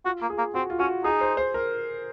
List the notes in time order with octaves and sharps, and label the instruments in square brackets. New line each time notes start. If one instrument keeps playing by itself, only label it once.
[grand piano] F4 [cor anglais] F#4
[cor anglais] A#3
[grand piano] G#4
[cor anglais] A#3
[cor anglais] C4 [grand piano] F#4
[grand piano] F4
[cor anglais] C#4 [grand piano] F#4
[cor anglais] D#4 [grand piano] G#4
[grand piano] C5
C5
A#4